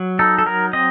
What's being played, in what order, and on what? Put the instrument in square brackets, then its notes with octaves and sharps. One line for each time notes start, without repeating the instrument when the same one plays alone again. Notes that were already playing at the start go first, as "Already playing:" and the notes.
Already playing: [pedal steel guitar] F#3
D#4 A4
A4
F#3 A#4
C4 D#5